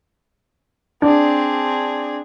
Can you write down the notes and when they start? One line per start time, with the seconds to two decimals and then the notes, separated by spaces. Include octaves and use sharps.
1.02 C4 D4 G#4